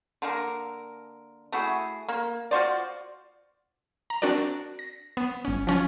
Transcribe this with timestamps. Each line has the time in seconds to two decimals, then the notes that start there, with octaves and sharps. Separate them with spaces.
0.22 D3 A#3 A#4
1.52 A3 E4 F#4 G#4
2.08 A#3
2.51 F4 F#4 C5 D5
4.10 A#5
4.22 C4 D4 F#4 A#4 D5
4.79 A#6
5.17 B3
5.45 G1 C#4
5.67 F3 C#4 F4